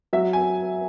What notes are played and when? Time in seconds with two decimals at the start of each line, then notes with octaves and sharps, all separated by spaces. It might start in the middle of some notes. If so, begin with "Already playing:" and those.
0.13 F#3 E5
0.33 G#5